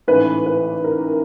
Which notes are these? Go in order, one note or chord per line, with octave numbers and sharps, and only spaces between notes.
A1 G#2 E3 A3 B4
B4
A#4